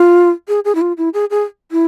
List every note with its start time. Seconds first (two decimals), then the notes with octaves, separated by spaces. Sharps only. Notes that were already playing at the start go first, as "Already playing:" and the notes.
Already playing: F4
0.48 G#4
0.65 G#4
0.75 E4
0.81 F4
0.98 E4
1.14 G#4
1.30 G#4
1.72 E4